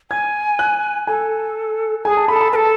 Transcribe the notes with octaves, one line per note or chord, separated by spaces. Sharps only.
G#5 G#6
F#6
A4 G#5
G#4 A4 G#5
A5
A4 B5
A5
B5
A4 B4 A5